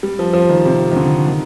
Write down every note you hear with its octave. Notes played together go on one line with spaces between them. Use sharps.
G3
F3
F3
D#3
C3
D#3
D3
D#3